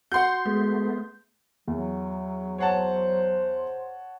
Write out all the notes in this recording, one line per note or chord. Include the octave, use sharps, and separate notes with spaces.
F#4 F#5 C6 G6
G#3 A3 B3
E2 F#3
C5 C#5 F#5 A5